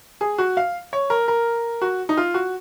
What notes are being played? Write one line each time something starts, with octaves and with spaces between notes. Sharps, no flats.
G#4
F#4
F5
C#5
A#4
A#4
F#4
D#4
F4
F#4